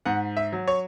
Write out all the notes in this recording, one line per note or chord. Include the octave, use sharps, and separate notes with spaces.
G#2 F#5
E5
F#3
C#5